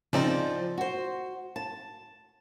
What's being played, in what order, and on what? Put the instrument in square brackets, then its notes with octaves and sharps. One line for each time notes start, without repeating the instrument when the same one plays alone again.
[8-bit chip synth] C#3 C4 D#4 [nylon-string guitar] F3 D5
[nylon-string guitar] F#4 C5
A5